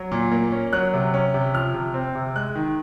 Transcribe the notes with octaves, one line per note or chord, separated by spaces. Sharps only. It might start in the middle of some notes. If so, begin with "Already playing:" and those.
Already playing: F#3
A#2
A#3
C#4
F#3 F#6
C3
C#4
C3
F3 F6
C3
C4
C3
G#3 F#6
D#3